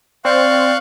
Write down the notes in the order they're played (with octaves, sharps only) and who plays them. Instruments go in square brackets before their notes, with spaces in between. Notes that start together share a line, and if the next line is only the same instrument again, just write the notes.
[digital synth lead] C4 [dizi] D5 [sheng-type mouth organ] F5 C#6 F#6